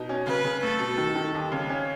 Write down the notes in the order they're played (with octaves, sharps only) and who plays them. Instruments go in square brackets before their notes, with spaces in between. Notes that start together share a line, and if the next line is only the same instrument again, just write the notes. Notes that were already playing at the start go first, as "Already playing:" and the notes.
Already playing: [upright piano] B2 D#4
C#4
[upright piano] C#3 [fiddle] B4
[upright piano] C#3
[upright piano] A3 [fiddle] A4
[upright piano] B2
D#3
D#3
D#2
C#3
C#4